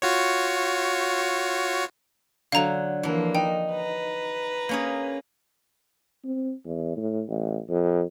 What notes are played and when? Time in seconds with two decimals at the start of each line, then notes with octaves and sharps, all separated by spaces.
0.02 F4 F#4 C#5
2.52 D3 F#3 F5 A#5
3.03 E3 F3 A#3 D4
3.35 D#4 G5
3.71 B4 A#5
4.69 A#3 C#4 G#4
6.25 C4
6.65 E2
6.97 A2
7.29 A1
7.69 F2